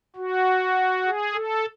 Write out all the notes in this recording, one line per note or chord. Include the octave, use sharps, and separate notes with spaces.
F#4
G#4
A4